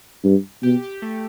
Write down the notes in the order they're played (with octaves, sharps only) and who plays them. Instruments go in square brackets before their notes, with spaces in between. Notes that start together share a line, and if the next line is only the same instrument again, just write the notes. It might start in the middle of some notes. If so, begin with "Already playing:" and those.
[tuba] G2
[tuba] B2 [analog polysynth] G4
[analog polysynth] G4
A3